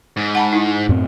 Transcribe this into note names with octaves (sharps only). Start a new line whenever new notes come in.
G#2
F#5 A5 B5
D#4 E4
F#2 A2 C4